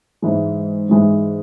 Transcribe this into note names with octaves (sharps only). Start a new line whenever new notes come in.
G#2 E3 G#3
G#2 E3 G#3